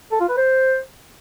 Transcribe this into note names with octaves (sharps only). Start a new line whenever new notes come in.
A4
F4
B4
C5